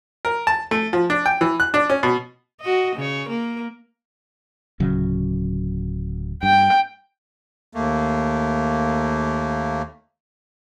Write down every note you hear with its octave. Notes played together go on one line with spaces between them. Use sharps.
A#4
A5
A3
F3
D4
G5
E3
F#6
D4
C#4
B2
F#4 D#5
C#3 C#5
A#3 A#4
D1 C#3 F#3
G2 G5
D#2 A3 A#3